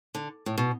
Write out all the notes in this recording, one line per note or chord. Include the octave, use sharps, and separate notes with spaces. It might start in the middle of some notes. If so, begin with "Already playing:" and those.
D3
A2
B2